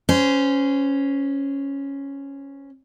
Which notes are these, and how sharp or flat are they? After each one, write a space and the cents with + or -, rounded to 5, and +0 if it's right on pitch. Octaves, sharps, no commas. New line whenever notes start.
C#4 +0 C5 -25